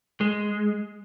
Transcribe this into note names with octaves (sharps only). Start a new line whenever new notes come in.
G#3